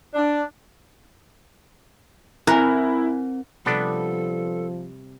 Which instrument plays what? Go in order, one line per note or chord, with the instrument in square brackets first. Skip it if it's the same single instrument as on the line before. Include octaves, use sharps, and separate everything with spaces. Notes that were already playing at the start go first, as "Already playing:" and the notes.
[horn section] D4
[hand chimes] C4 [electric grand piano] E4 [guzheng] A#4 [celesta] G#5 F#6
[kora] C3 G3 [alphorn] F3 [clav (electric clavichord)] B3 D4 [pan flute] A4